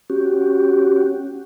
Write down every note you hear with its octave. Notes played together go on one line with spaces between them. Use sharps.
C#4 F#4 G4